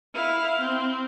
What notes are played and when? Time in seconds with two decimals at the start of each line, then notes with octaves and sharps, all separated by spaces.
0.15 E4 F5
0.62 C4